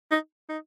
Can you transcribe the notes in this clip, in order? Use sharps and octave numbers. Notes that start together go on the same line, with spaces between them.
D#4
D#4